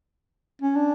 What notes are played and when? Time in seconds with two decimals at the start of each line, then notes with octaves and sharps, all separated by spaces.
0.62 C#4
0.76 D4